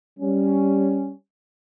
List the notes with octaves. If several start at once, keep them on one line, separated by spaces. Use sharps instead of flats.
G3 C#4